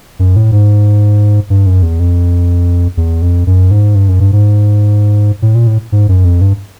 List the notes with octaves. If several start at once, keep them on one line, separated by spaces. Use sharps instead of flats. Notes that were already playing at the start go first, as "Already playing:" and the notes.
F#2
A2
G#2
G2
F#2
E2
F2
E2
F2
F#2
G#2
G2
F#2
G2
G#2
A2
A#2
A2
G#2
F#2
F2
G2